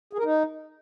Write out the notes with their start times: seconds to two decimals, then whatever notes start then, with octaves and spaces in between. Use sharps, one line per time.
0.13 G#4
0.18 A#4
0.24 D#4